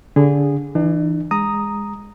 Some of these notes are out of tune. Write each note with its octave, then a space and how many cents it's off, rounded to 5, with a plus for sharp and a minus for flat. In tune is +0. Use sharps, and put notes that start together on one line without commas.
D3 -30 G#4 -20
E3 +0 D4 +45
G#3 -15 A#5 +0 D#6 +0